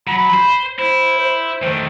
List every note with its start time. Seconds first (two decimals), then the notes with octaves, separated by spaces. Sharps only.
0.07 F#3 B5
0.34 C5
0.79 E4 C5
1.18 C5
1.63 D#3 A3 C5